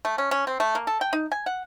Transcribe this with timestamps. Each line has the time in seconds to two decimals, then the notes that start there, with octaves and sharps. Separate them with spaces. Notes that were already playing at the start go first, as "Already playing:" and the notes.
0.05 A3
0.18 C#4
0.31 C#4
0.47 C4
0.60 A3
0.75 A#3
0.87 A4
1.01 G5
1.13 D#4
1.32 G#5
1.46 F#5